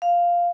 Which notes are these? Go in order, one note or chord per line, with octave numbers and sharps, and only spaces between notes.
F5